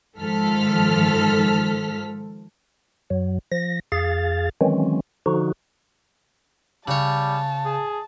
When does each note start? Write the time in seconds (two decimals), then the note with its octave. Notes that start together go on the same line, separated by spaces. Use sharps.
0.18 G#2 D#3 F3 A4 F6 B6
3.10 F#2 F#3
3.52 F3 A#6
3.92 F2 G#4 F5 A6
4.61 D#3 E3 F#3 G#3 C4 C#4
5.26 D3 F3 D#4 F#4
6.88 C#3 G3 C#5 A5
7.65 G#4